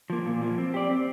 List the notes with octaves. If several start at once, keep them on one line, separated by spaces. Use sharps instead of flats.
F3 A#3
A#2
F3 A#3
C4
G4 D5
C4